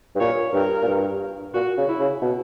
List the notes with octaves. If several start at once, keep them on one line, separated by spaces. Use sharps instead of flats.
G2
A#2 C#5
G2 A#4
A#2
G2
A#2 F#4
C#3
E4
C#3
B2